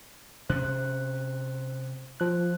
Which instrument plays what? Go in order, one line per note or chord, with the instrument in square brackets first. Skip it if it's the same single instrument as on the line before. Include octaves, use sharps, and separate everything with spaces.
[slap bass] C3 C#4 [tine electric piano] C5 F#6
[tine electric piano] F3 F#6